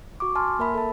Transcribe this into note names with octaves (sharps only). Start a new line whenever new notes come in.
F#4 C#6 D6
G#5 A5 C6 F6
A#3 A#4 E5 B5
A4 E5 A5